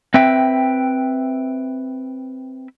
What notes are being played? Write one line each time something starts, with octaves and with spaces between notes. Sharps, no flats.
C4 B4 E5 G5